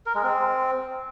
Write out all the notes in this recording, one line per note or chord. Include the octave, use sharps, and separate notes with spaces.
A#4
G#3
C4